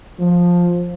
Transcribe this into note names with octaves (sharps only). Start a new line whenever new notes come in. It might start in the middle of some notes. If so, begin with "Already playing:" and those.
F3